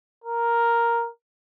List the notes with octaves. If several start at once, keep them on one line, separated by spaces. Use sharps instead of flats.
A#4